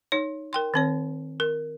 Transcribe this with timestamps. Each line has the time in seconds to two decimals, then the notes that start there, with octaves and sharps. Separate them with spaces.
0.12 D#4 C#5
0.53 A#4 G5 C6
0.74 D#3 C4 C#5
1.40 A#4